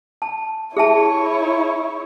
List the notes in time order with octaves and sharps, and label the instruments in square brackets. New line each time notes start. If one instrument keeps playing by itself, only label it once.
[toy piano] A5
[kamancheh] E4 C#5 [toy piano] G#4 E5 A5